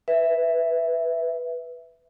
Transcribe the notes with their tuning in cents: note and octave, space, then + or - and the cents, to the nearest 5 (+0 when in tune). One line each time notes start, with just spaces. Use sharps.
B4 +0 E5 +0